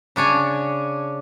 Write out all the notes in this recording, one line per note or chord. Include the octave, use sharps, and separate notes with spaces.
C#3 D4 C#5 G#5